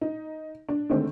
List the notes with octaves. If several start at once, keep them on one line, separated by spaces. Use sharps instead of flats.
D#4
D4
D3 D#3 G#3 A3 C4